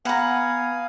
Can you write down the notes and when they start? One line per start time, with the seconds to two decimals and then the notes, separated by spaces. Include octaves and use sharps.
0.05 B3 F5 F#5 G#5 A#5 B5 D#6